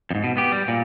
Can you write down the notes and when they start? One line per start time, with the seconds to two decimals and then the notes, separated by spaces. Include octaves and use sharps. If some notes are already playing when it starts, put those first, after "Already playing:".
0.10 F2 G#2
0.24 B2
0.37 B3 G4
0.52 G3
0.68 A#2